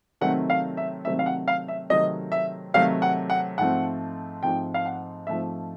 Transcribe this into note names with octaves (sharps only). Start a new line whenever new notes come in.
C3 D#3 F#3 A3 C4 F#5
F5
E5
C3 D#3 F#3 A3 C4 E5
F5
F#5
F5
E5
C3 D#3 F#3 A3 C4 D#5
E5
C3 D#3 F#3 A3 C4 F5
F#5
F#5
G#2 F3 A3 C4 F#5
G#2 F3 A3 C4 G5
F5
F#5
G#2 F3 A3 C4 E5